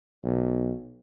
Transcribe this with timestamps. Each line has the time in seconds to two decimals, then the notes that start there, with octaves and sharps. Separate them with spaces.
0.24 B1